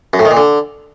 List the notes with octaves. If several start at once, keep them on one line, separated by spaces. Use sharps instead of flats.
F#2
A2
D#3
A#2
D3